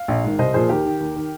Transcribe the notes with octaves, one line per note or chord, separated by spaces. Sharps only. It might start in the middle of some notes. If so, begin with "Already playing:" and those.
Already playing: F5
A#1
G#2 D#3
C2 C5 D#5
A#2 F3 G#4 C5
D#2 G4 A#4
D#3
D#2
D#3